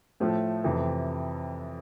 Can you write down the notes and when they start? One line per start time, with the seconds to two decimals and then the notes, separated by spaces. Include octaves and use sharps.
0.20 A2 F3 A3
0.64 F2 C3 E3